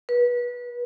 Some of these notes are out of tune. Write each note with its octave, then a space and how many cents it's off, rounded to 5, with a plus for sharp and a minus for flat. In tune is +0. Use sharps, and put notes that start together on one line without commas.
B4 -25